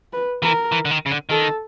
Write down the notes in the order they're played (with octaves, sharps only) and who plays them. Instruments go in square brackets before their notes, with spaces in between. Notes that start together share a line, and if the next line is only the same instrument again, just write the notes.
[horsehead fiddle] B4
[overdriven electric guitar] E3 [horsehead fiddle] A#4
[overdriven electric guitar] E3
D3
D#3
C#3
D3
[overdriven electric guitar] D#3 [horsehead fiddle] A4